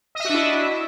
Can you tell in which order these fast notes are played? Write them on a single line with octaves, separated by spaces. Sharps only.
D#5 E5 F#4 D4 E4